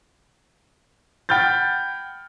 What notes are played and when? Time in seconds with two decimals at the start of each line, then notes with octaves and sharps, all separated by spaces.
1.29 F#5 G5 B5 F6 G6 A6